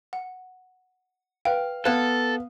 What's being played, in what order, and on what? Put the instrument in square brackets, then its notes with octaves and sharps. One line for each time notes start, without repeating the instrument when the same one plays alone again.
[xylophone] F#5
[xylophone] B4 G5 [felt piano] F5
[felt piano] B3 F5 [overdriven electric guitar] A4 [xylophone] F#6 G#6 E7